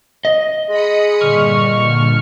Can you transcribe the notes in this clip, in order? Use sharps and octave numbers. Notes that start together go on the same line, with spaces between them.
D#5
G#3 B5 D#6 C#7
G2 A#2 D3 C#6 F6